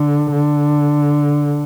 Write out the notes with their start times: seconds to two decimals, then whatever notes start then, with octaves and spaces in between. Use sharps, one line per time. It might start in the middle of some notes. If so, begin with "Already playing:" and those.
Already playing: D3
0.32 D3